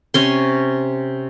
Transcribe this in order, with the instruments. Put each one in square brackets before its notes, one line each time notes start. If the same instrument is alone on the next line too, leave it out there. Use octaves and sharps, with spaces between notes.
[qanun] C3 C#4 C6